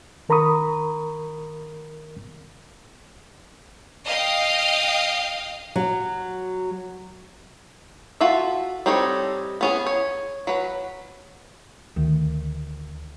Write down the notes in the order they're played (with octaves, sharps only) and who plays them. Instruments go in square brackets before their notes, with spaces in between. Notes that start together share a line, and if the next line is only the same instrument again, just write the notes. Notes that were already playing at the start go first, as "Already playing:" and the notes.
[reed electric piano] D#3 A#4 A#5 B5 C#6 D#6
[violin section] D#5 F5 G5
[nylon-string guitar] F#3
[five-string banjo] F4 F#4 A4 E5
G3 C4 D#4 A4 C#5
B3 C#4 G#4
C#5
F#3 B4
[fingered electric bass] D2 [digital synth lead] D#3